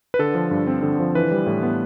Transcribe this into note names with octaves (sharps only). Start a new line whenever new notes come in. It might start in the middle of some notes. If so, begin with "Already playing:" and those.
B4
D3 A4
F3
G2
C4
D3
F3
E3 B4
G3
A2
B3